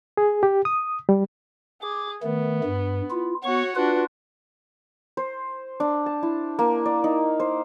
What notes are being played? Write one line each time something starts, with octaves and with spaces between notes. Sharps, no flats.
G#4
G4
D#6
G3
G#4 D6
D#3 A3 B3
G2
E4 F4
B3 F#4 C#5 C#6
D4 F4 F#4 B4
C5
D4
A5
E4
A#3
D5
D#4
C5